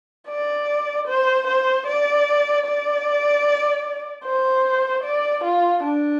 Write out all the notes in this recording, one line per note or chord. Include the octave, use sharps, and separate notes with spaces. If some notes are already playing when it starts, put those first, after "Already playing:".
D5
C5
C5
D5
D5
C5
D5
F4
D4